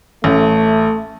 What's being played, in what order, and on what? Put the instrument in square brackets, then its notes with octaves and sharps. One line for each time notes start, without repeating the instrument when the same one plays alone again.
[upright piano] A1 [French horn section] A3